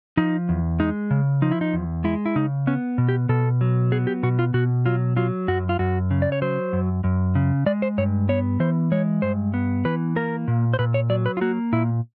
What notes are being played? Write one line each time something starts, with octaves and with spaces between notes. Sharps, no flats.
F3 D#4
E2
G#3 D#4
C#3
F3 D#4
E4
D#4
E2
G#3 E4
E4
C#3 D#4
B3 C#4
B2
G4
B2 A4
F#3
B3 G#4
G4
B2 F#4
F4
B2 F#4
F#3 F4
F#3 F4
F#2 F#4
F4
F#2 F#4
C#3
D5
C#5
F#3 C5
F#2
F#2
C#3
G#3 D5
C5
G2 C#5
B3 C#5
E3 C5
G#3 C#5
G2 C5
B3
E3 B4
A#3 A#4
A#2
C5
A#2 B4
C#5
F#3 D5
B4
F4
A#3 F#4
A#2 E4